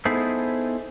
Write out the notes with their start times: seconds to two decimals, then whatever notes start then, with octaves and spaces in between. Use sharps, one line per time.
0.05 B3 D#4 E4 G#4 A4 C5